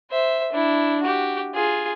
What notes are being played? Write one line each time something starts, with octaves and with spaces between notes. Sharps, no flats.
C5 E5
D4 E4
F#4 G4
F4 G#4